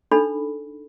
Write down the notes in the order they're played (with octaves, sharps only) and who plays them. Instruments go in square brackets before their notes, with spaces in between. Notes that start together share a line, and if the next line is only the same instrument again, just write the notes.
[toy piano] D4 D#4 A4 B5